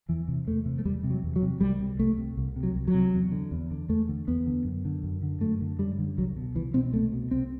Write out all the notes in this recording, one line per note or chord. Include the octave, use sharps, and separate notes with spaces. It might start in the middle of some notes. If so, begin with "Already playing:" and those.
E2 E3
C3
E2 A3
C3
A3
E2 G3
C3
F#3
E2
F#3
C3
C2 G3
C3
C2 A3
C3
C2
C3
F#3
C2
F#3
C3
E2
D3
E2
D3
E2 A3
D3
E2 B3
D3
F#2
D3
F#2
D3
F#2 A3
D3
F#2 G3
D3
C2 F#3
B2
C2 E3
B2 C4
C2 A3
B2
C2 C4